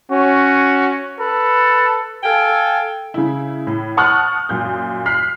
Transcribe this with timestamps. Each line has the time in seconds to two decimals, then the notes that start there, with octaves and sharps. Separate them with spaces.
0.11 C#4 F#4
1.20 A4 B4
2.23 A4 F5 G5 G#5
3.14 C#3 E4
3.67 A2
3.97 F#5 A5 C#6 D#6 F6 F#6
4.49 F#2 A#2 G6
5.06 F6 F#6 B6 C7